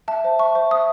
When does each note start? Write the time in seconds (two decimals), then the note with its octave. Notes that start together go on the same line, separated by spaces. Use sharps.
0.08 E5 A5
0.24 C5
0.39 E5 C#6
0.55 C5
0.71 E5 D#6